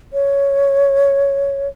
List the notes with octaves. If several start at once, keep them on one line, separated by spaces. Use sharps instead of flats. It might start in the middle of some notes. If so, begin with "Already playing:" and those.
C#5